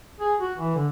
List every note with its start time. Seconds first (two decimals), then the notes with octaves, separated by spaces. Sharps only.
0.20 G#4
0.40 F#4
0.58 E3
0.75 D3